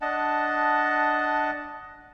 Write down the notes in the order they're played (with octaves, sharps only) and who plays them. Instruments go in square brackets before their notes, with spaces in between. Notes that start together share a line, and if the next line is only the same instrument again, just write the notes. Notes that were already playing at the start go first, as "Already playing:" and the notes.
[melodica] D4 D#5 F#5 A5